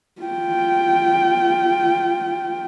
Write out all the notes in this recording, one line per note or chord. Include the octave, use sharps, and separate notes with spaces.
F4 G5